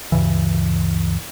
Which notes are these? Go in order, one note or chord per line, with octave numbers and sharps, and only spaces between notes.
D2 G2 C#3 E3